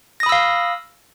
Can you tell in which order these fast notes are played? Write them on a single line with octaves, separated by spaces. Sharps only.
A#6 D#6 B5 E6 F5